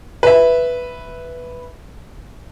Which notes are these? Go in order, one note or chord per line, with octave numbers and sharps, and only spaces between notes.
B4 E5